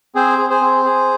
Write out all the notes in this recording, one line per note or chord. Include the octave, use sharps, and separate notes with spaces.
C4 G#4 C5
G#4
G#4 C5
C4
G#4